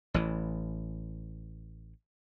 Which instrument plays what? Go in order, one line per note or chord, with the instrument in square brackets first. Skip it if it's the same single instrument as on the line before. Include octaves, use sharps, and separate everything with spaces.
[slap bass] A1 E3